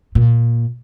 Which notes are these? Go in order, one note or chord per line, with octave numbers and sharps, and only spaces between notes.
A#2